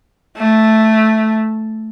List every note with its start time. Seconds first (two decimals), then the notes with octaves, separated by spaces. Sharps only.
0.37 A3